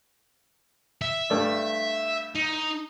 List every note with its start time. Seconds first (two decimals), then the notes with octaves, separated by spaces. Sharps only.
1.02 E5
1.30 G2 A3 D5
2.35 D#4